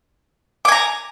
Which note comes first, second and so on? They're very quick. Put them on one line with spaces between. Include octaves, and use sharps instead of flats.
D6 G#5 A#5